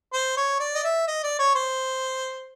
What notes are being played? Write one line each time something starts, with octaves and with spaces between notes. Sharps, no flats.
C5
C#5
D5
D#5
E5
D#5
D5
C#5
C5